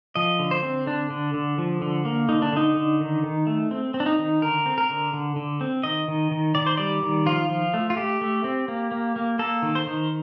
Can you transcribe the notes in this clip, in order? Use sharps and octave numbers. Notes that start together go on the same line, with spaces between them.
F3 D#5
D3
C5
C4
D3 D4
D3
D3
F3
D3
A#3
D3 D#4
D4
D3 D#4
D3
D#3
D#3
A3
C4
C4
D4
D#4
D#3
D3 A#4
C4
A#4
D3
D3
D3
C4
D#3 D#5
D#3
D#3
D#3 D5
C5
G3 D5
D#3
F3 F4
F3
A3
F4
A3 G4
A3
C4
A#3
A#3
A#3
A#3 A4
D#3
C5
D#3